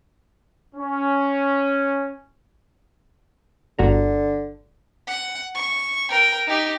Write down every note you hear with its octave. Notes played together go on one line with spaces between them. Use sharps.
C#4
G1 D3 F#4 A#5
F#5
C#6
A#4 G5
D#4 G4